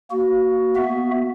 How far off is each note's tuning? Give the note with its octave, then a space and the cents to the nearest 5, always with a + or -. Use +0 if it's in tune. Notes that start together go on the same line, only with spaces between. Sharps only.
A#3 +0 F#4 +15
B3 +0 F#4 +0 E5 +0